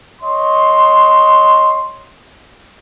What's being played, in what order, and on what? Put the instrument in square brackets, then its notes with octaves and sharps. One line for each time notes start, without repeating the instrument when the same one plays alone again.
[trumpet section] C#5 D#5 C6